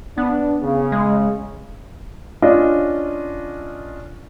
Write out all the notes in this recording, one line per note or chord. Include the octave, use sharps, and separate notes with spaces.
B3 D4
C#3
G#3
C#4 D4 F4 D#5